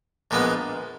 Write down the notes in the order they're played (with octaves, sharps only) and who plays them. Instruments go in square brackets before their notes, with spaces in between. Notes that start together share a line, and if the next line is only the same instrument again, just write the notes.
[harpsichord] A#1 A#2 G#3 B3